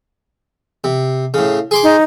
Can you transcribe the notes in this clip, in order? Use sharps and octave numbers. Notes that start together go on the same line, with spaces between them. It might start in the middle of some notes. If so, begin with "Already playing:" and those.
C3
A2 C#3
G#4 C6 D6
D#4